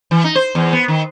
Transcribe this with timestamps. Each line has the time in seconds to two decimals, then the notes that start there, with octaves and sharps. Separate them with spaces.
0.11 E3
0.24 D#4
0.35 C5
0.55 E2
0.73 B3
0.88 D#3